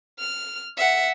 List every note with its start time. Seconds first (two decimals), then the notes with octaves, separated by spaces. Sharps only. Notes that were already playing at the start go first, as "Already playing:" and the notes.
0.19 F6
0.77 E5 F#5